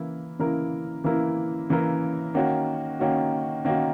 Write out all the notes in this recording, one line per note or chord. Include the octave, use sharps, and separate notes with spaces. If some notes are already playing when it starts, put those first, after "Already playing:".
Already playing: C#3 E3 A#3 E4 A#4
C#3 E3 A#3 E4 A#4
C#3 E3 A#3 E4 A#4
C#3 E3 A#3 E4 A#4
D#3 A#3 C#4 F#4
D#3 A#3 C#4 F#4
D#3 A#3 C#4 F#4